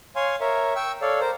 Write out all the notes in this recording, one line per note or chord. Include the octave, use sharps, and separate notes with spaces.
C#5 F5 G#5 C6
A#4 C#5 E5
G5 C#6 E6
A4 C#5 D5 F5
A#4 C5